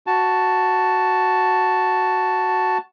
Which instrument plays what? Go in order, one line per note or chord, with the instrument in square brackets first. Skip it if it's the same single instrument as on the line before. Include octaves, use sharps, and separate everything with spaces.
[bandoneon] F#4 A5